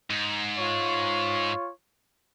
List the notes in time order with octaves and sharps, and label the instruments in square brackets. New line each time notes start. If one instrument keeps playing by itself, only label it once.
[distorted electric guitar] G#2
[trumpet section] F4 C#5